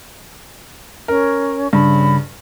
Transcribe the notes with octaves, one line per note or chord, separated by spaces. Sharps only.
C#4 A#4
G2 C#3 B5